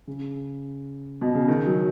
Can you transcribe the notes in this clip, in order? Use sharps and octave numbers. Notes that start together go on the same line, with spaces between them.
C#3
B2
C#3
D#3
F#3